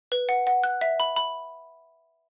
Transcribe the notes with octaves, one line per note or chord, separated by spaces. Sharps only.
B4
F#5
F#5
F#6
E5
B5
B5